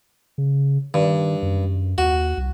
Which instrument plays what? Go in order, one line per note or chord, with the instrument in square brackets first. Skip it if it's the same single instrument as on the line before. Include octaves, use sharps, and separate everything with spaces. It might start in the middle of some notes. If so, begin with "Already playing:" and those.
[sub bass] C#3
[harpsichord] G2 [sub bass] D#3
[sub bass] F#2
[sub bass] D#2 [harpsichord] F#4
[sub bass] C2